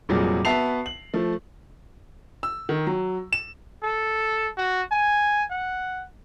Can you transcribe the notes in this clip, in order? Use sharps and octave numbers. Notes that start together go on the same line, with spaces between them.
F1 A#2 F#3 G3 G#4
B3 F#4 E5 A5 C7 F7
F#7
F3 A3
E6
D#3
F#3
E7
A4
F#4
G#5
F#5